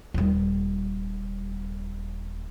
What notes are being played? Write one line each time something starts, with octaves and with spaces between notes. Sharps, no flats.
D#1 G3